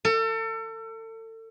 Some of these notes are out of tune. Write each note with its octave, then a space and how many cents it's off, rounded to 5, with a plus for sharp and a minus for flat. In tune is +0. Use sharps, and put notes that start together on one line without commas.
A4 +35